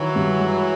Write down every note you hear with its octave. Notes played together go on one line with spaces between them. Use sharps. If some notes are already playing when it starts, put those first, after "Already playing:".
Already playing: D#3 E3 F#3
G2
G#3